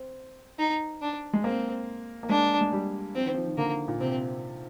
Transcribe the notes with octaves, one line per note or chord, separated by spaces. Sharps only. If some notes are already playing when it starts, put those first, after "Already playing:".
Already playing: C4
D#4
D4
G#3
A#3 C4
A#3
G#3 D4
G#3
G3
F3 C4
D#3
F3
D#3
D3 A#3
A#2
C3 C4